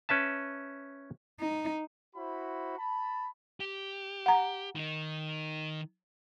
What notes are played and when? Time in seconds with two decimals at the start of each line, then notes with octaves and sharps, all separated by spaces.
0.09 C#4 B4 E5 A5
1.40 D#4
2.16 E4 F#4 C5 B5
2.77 A5 B5
3.60 G4
4.26 F#5 A#5
4.76 D#3 D#4